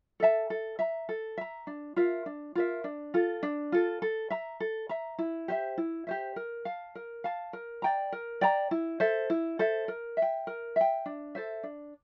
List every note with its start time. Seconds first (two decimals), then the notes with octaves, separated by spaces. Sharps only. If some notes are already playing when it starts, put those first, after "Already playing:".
0.20 A4 E5 A5
0.50 A4
0.79 E5 A#5
1.09 A4
1.38 E5 A#5
1.67 D4
1.96 F4 A#4 E5
2.26 D4
2.55 F4 A#4 E5
2.84 D4
3.14 F4 A4
3.43 D4
3.72 F4 A4
4.02 A4
4.30 E5 A#5
4.60 A4
4.89 E5 A#5
5.19 E4
5.48 G4 C5 E5
5.78 E4
6.07 G4 C5 E5
6.36 A#4
6.65 F5 A5
6.95 A#4
7.24 F5 A5
7.53 A#4
7.82 D5 G5 A#5
8.12 A#4
8.41 D5 G5 A#5
8.71 E4
9.00 A4 C5 E5
9.30 E4
9.59 A4 C5 E5
9.88 A#4
10.17 E5
10.22 G5
10.47 A#4
10.76 E5 G5
11.06 D4
11.35 A4 C5 E5
11.63 D4